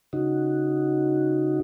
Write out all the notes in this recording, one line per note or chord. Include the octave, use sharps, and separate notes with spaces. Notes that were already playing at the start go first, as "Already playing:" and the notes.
C#3 D#4 F#4